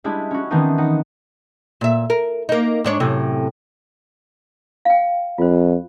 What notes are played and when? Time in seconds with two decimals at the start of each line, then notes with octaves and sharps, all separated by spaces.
0.04 G3 G#3 D4 E4
0.31 C#4 F#4
0.51 D#3 E3 B3 C4 D4 D#4
0.78 D#4 F#5
1.81 A#2 E5
2.10 A#4
2.49 A#3 D#4
2.84 G#2 D4 C#5
3.00 F#2 A2 C3
4.85 F5 G5
5.38 F2 F4 C5